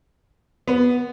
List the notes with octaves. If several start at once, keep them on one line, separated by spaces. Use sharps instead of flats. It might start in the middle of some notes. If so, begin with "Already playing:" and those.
B3